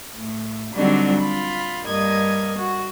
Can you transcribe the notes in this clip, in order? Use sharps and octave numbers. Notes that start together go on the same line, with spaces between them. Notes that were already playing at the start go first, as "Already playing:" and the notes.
A2
D3 F#3 G3 C4 D4 D#4
F4 B5
G2 A#3 D#5 G#6
F#4